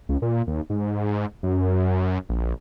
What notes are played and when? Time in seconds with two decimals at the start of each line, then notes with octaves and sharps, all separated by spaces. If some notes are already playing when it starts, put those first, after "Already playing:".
0.09 C#2
0.22 A#2
0.47 D#2
0.70 G#2
1.43 F#2
2.29 A#1